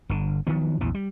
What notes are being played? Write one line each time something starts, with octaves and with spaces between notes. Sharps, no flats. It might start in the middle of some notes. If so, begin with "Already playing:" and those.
G1 D3
D#3 F3 F#3 B3
A#1 E2 E3
G3